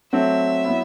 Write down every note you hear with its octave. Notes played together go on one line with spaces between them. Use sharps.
F#3 A3 C4 E5
F#3 B3 E4